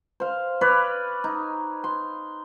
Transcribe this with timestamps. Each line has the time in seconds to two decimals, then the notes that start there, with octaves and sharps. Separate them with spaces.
0.20 C5 F5
0.61 B4 C#5 D5 F5
1.24 D#4
1.84 C6